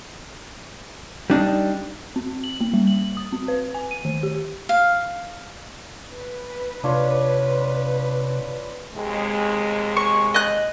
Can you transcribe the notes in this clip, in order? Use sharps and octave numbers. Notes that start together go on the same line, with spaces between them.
G3 D4 D#4
C4
F#7
A#3
G3
F#7
D#6
C4
B4
G#5
D#7
D#3
G4
F5
B4
C3 D4 F4 C#5
D#2 C3 G#3
C#6
D#5 F#6